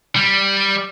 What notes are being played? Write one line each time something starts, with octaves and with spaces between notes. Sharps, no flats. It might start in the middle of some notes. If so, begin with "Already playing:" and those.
G3